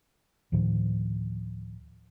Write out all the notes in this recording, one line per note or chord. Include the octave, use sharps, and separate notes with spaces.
D2 A2 D#3 F3